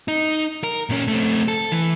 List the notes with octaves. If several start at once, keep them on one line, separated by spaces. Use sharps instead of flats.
D#4
A#4
A#2 C#4
A3 C4
A4
E3